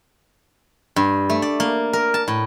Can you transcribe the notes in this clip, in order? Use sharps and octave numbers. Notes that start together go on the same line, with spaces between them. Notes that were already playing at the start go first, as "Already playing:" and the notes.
G2
A3
D5
A#3
A#4
A5
A2